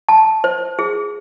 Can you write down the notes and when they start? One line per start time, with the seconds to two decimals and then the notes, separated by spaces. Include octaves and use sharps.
0.09 A5
0.44 C5
0.79 G#4